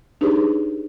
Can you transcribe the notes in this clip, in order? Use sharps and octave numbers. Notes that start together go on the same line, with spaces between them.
D4 D#4 G4 G#4 B4 C#5